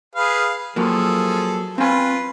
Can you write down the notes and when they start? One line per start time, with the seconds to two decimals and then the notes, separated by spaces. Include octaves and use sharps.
0.15 G#4 B4 F5
0.76 F3 F#3 A#3 G#4 A4
1.78 C4 F4 B4 G#5